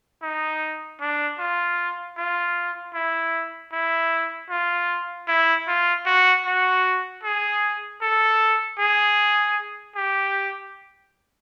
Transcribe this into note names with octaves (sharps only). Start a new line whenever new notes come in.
D#4
D4
F4
F4
E4
E4
F4
E4
F4
F#4
F#4
G#4
A4
G#4
G4